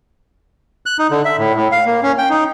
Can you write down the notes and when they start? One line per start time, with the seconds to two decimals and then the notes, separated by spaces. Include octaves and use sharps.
0.86 F#6
0.99 D#4
1.11 D3
1.25 E5
1.38 A2
1.55 A2
1.72 F5
1.86 A#3
2.03 C#4
2.18 G5
2.30 D#4